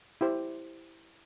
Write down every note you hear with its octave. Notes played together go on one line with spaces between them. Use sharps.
E4 G4 C5